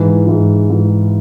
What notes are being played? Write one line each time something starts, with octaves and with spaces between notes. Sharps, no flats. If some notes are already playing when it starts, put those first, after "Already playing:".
Already playing: G#2 E3
G#2 E3
G#2 E3